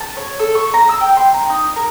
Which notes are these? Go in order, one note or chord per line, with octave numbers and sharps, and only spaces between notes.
A5
C#5
A4
C#6
A#5
E6
G5
C6
A#5
D#4
A#4